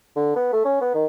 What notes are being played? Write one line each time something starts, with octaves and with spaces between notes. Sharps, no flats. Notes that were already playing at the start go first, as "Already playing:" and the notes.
D3
B3
A3
C#4
B3
D#3